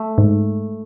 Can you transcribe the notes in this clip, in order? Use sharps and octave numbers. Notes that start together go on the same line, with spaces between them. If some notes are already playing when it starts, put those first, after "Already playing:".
Already playing: A3
G#2